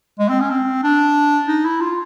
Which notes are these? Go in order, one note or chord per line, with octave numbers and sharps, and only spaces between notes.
G#3
C4
C#4
C4
D4
D#4
E4
F4